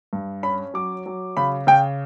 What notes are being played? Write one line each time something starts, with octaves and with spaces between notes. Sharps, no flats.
G2
C#4 B5
F#3 D6
F#3
C#3 B5
C#3 G5